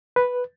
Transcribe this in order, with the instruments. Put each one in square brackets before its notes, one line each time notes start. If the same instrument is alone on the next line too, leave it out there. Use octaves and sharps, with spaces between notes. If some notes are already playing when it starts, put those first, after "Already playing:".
[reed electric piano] B4